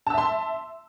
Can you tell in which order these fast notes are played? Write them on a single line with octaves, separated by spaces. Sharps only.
A5 E6 E5 C6